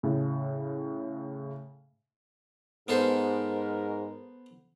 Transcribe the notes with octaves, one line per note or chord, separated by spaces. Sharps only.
A2 C#3
G#2 B3 A4 A#4 C5